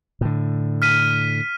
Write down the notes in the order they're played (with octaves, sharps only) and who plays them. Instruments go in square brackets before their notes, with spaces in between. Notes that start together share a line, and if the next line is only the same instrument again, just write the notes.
[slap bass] A2 D3
[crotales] F6 B6 D#7